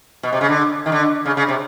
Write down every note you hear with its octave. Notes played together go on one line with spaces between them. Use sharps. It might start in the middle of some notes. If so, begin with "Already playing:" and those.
B2
C3
C#3
D3
D#3
D3
C#3
C#3
C3